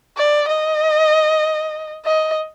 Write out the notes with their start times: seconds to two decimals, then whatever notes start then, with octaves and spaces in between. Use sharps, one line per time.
0.18 D5
0.48 D#5
2.05 D#5